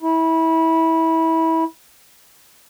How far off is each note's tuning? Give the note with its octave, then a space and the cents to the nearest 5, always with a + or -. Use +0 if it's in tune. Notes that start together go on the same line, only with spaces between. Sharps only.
E4 -25